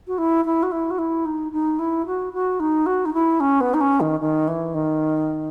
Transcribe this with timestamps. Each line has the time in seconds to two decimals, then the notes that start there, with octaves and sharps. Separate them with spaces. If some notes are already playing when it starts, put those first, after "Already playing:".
0.07 F#4
0.18 E4
0.45 E4
0.63 F#4
0.72 E4
0.90 F#4
0.98 E4
1.25 D#4
1.52 D#4
1.79 E4
2.06 F#4
2.33 F#4
2.60 D#4
2.86 F#4
3.05 D#4
3.13 E4
3.40 C#4
3.61 B3
3.74 D#4
3.81 C#4
4.00 D#3
4.20 D#3
4.48 E3
4.74 D#3